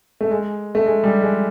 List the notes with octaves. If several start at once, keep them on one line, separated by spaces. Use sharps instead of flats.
A3
G#3
A3
G#3
G3
G#3